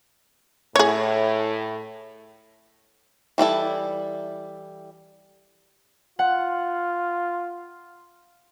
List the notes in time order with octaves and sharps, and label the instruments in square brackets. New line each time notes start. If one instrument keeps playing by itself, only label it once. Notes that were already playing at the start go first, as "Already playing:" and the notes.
[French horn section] A2 [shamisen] G#4 C#5
[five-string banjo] E3 G3 E4 A4
[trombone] F4 [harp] F#5